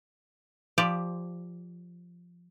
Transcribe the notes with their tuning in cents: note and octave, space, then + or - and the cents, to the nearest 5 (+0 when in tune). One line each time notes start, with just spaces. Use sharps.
F3 +0 G4 +15 D5 +0